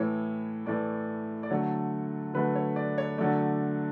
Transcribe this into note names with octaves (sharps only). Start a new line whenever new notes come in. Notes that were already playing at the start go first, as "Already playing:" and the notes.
Already playing: A2 E3 A3 C#5
A2 E3 A3 D5
D5
D3 F#3 A3 C#5
D3 F#3 A3 B4
C#5
D5
C#5
D3 F#3 A3 D5